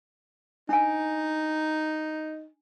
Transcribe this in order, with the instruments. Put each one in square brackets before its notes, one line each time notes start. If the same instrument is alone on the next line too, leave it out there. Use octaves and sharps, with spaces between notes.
[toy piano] D4 G#5 [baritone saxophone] D#4